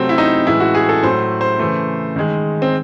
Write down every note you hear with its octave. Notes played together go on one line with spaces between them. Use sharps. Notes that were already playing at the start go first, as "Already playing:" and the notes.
Already playing: C3 F#3 A3 C4
E4
D#4
A2 E3 G#3 E4
F#4
G#4
A4
A2 F#3 A3 C5
C5
C#3 E3 A3
D#3 G#3
C4